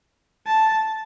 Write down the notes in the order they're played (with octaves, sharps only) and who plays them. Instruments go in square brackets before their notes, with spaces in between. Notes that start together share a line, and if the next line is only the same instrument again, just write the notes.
[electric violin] A5